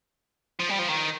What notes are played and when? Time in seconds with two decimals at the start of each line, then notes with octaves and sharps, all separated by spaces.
0.59 F3
0.69 G3
0.79 F3
0.88 D#3